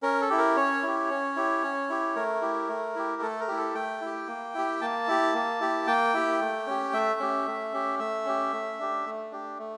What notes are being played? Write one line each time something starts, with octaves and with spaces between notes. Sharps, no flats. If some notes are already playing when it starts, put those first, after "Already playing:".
C#4 A#4
A4
E4 G4
A#4
C#4 C#5
E4 G4
C#4
E4 G4
C#4
E4 G4
A3 A#4
E4 G4
A3
E4 G4
A3 A4
A#4
E4 G4
A4
A3 G5
E4 G4
A#3
E4 G4
A#3 A5
E4 G4
A#3
E4 G4
A#3 G5
E4 G4
A3
C#4 G4
A3 E5
C#4 G4
A3
C#4 G4
A3 E5
C#4 G4
A3
D4 G4
A3
D4 G4
A3